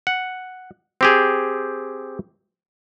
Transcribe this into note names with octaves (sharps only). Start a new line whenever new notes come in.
F#5
C4 G4 G#4